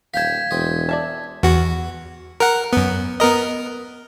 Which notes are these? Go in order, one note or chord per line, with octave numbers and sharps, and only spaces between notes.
D#1 F5 G5 A5 G#6 B6
E1 C4 D#5
D5 E5 A5
E2 F#4
A#4 F#5
F#2 B3
B3 A#4 D#5